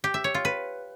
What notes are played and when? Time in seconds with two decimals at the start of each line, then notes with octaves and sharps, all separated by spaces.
0.04 G4
0.14 E5
0.24 C#5
0.34 F4
0.45 B4